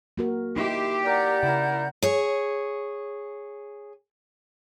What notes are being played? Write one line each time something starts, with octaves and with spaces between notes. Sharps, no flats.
A#3 F#4 A#4
D#4 E4 G4 E5 C6
A#4 D5 F#5 G6
C#3 E4 A#4
G#4 C#5